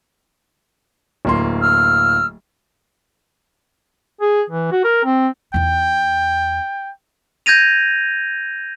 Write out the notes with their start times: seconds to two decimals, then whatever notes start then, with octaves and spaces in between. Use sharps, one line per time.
1.25 D1 A#3 C6
1.60 E6 F6
4.22 G#4
4.50 E3
4.72 F#4
4.84 A#4
5.05 C4
5.54 E2 D#4 G5
7.46 G6 G#6 A#6 D#7 F7